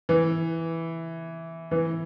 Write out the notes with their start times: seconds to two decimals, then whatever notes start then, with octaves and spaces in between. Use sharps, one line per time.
0.09 E3
1.71 E3